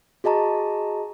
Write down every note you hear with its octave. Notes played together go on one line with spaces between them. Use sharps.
F#4 G#4 D#5 A5 A#5 C#6